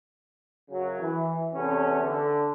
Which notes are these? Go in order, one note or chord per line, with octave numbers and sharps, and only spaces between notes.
F#2 C#3 F#3
E3
E2 C3 B3 C#4 A4
D3